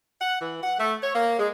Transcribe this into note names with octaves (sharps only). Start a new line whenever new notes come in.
F#5
E3
F#5
A3
C#5
A#3
G#3